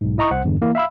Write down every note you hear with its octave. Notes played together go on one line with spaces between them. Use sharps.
B1 G#2
E4 D#5 A#5 C#6 D#6
C2 C5 F#5
E2 G2 D3
E3 A#3 E4
E5 F5 B5 E6